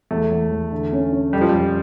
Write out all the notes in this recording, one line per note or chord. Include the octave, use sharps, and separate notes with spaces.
E2 A3
E2
E2
D3
C#4
C#4
F2 G3
F3
F2 G3